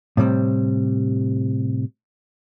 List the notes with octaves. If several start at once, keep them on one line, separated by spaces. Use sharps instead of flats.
A2 C3 G3 C4